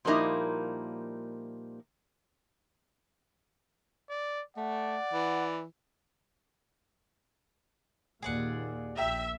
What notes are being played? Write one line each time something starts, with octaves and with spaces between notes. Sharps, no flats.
A#2 F3 G3 A#3 D#4 E4
D5
A3 D5 F#5
E3
D#2 A#2 G#4 D5 F#5
A#1 E5 G5 A#5